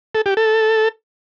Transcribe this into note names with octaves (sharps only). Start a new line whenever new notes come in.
A4
G4
A4